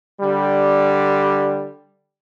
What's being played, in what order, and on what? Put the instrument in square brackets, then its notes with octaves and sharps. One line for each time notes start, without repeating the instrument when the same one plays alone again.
[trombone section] D3 G3